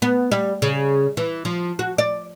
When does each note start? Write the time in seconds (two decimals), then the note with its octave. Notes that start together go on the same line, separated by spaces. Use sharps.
0.02 B3
0.31 G3
0.62 C#3
1.17 E3
1.45 F3
1.79 F#4
1.98 D5